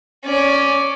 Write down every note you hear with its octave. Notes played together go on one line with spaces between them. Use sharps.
C#4 D5